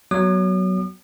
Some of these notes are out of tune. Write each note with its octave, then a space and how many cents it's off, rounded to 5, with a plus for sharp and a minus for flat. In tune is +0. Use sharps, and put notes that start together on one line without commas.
F#3 +15 B3 +0 D#6 -45